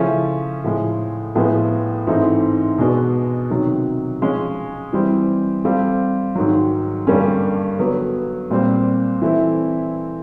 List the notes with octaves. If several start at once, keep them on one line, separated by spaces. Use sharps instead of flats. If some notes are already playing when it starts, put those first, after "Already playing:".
Already playing: C#3 F3 A3 C#4 E4
A2 F3 G#3
A2 F3 G#3 B3
G#2 E3 A3 C4 D#4
B2 G#3 B3 D4 F#4
C3 D#3 F#3
F3 G#3 C#4
E3 G3 C4
G3 C4 F4 A4
G#2 D#3 F#3
G2 D3 G3 A#3 C#4
D3 F#3 B3
A#2 G3 C4
E3 A3 C4 E4